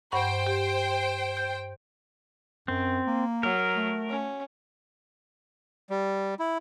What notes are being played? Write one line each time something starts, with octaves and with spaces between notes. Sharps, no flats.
G2 C5 F#5 G5 C#6
G4
G6
F#2 C4
A#3
F#3 A#4
A3
C#4
G3
E4